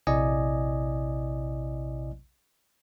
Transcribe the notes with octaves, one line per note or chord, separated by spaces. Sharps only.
A#1 C3 E4 D5 D#5 G#5